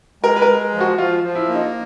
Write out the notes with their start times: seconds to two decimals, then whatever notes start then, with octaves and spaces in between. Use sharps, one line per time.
0.23 G#3 A#4
0.36 B4
0.42 A#4
0.49 G#3
0.74 F3
0.80 F#4
0.98 F3 F4
1.23 F3
1.35 E4
1.49 A#3
1.55 D#4